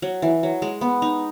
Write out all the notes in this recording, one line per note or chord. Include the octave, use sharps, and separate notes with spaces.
F#3
E3
F#3
G#3
B3
D#4